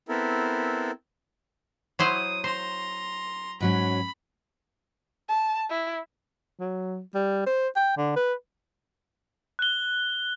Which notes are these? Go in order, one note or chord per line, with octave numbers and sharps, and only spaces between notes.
B3 C4 E4 A4 A#4
F#3 E4 C5 D#6
C5 A#5 C6
G#2 F#3 C#4 B5
A5
E4
F#3
G3
C5
G5
D3
B4
F#6 G7